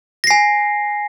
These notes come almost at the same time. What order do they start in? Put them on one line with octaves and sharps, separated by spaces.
A#6 C7 G#5